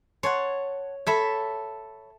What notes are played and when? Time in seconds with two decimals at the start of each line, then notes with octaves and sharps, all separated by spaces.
0.23 C#5 F#5 A5 C6
1.07 A4 C#5 E5 B5